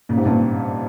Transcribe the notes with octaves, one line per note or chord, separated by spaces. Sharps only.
A#2 C#3
G#2 C3
G2 A#2